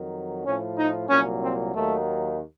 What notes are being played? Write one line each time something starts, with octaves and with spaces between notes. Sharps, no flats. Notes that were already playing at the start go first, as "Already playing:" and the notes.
Already playing: F2 D#3 F#3
A2 F3 C#4
D#4
C2 A#2 F#3 C#4
C4
D#2 D#3 F#3 A3